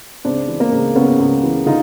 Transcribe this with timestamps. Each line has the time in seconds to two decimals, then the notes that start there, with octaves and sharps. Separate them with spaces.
0.24 C#2 C4 D4
0.48 E3
0.60 A#3 C4
0.72 C#2
0.95 C#3 B3 C#4
1.19 C#2
1.43 E3
1.66 D3 D#4 F4